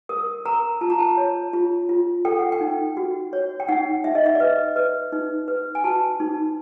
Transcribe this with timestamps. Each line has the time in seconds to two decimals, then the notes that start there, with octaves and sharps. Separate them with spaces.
0.09 A#4 D#6
0.45 A#4 A#5
0.81 F4 A5
0.90 A#5
0.99 A5
1.17 C#5
1.53 F4
1.89 F4
2.25 A4 G5
2.39 F#5
2.52 G5
2.61 D#4
2.97 F#4
3.33 C#5
3.60 G5
3.69 D#4 F#5
4.04 D#4 E5
4.15 D#5
4.26 E5
4.35 D5
4.40 B4 D#5
4.76 B4
5.12 D#4
5.48 B4
5.75 G#5
5.84 F#4 A5
6.20 D#4